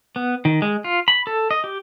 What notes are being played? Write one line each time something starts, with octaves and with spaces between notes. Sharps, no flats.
B3
D#3
G#3
F4
B5
A4
D#5
G4